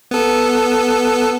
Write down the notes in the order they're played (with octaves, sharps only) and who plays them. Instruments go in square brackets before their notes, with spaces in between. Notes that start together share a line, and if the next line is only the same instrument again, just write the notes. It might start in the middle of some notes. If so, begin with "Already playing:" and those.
[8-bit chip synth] B3 A4